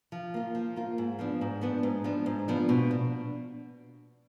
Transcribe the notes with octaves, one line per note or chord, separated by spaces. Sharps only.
F3
A#3 F4
F3
A#3 F4
G#2
F3 B3 D4
G#2
F3 B3 D4
G#2
F3 B3 D4
G#2
F3 B3 D4
B2
D4